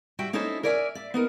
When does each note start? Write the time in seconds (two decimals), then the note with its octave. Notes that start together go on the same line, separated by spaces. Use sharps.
0.19 G3 F#4 E5 G5
0.33 C#4 D#4 E4 A4 C5 C#5
0.63 A#4 C#5 D5 E5 F#5 G#5
0.95 D5 E5
1.14 B3 D#4 A#4